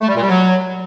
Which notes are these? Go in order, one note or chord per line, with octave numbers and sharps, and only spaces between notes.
A3
G3
A#2
G3
F#3